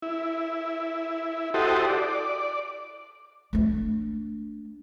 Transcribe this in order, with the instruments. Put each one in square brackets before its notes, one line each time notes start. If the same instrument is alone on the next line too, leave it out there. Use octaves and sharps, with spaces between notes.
[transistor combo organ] E4
E4 F#4 G4 A4 C5 D#5
D5
[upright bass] A3 D4